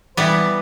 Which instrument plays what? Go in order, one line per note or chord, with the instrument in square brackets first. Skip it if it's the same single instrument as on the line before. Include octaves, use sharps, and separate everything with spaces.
[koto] E3 G3 B3 [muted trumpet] B4